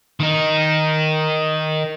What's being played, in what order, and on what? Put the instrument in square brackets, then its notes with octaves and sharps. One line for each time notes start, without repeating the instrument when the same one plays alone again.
[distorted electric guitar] D#3 D#4